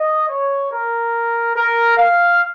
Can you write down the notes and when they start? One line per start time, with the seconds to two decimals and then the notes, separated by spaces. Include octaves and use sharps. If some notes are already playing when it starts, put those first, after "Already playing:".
Already playing: D#5
0.28 C#5
0.70 A#4
1.54 A#4
1.96 F5